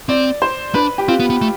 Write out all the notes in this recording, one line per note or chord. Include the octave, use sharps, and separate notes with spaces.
C4 D5
C5
D4 B4
G4
C4 F4
B3
B3
A3